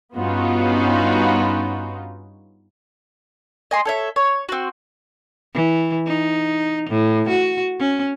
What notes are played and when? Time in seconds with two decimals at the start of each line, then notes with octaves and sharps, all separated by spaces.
0.16 G2 B3 C#4 D#4 F4 F#4
3.71 D#5 G#5 C6
3.85 A4 C#5 E5
4.16 C#5
4.49 C4 F#4
5.55 E3
6.07 D#4
6.90 A2
7.29 F#4
7.80 C#4